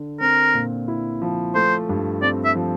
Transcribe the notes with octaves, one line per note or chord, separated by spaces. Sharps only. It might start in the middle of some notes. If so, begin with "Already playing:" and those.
Already playing: D3
C4 A#4
A#2
E4
F3
A3 C5
G2
C4 D5
E5
F3